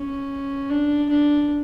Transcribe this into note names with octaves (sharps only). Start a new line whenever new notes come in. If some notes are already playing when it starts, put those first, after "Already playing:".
Already playing: C#4
D4
D4